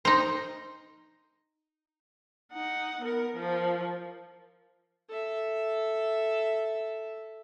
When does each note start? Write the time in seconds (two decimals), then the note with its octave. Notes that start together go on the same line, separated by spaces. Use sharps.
0.05 D#4 C5
2.53 D#4 F#5
3.01 B3 A#4
3.35 F3 A#4
5.09 A4 E5